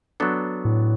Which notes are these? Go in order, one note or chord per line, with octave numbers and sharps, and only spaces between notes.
F#3 B3 D4 A4
A2